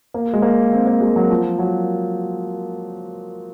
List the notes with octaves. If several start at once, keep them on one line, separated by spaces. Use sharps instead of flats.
A#3
G#3
A#3
C4
A#3
G#3
F#3
F3
F#3